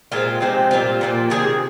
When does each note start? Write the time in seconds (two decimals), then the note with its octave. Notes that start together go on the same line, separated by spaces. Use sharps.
0.12 A#2 G#3 C4 F4
0.41 C3 F3 G#3 C4 D#4
0.71 A#2 G3 C4 F4
1.01 A#2 F3 A#3
1.30 C3 D#3 G#3 G#4